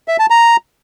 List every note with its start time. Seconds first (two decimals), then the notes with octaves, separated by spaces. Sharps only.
0.08 E5
0.19 A5
0.30 A#5